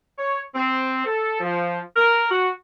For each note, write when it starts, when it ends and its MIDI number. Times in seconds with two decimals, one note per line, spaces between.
0.17 0.40 73
0.54 1.04 60
1.05 1.38 69
1.40 1.79 53
1.97 2.26 70
2.30 2.49 66